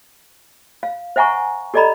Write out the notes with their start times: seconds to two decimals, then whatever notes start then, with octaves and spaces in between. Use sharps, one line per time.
0.83 F5
1.16 C5 E5 F#5 G#5 A#5 C#6
1.74 G4 A4 D5 D#5 A#5 B5